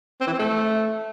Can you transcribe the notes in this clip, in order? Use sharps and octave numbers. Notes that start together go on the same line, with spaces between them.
C4
E3
C4
A3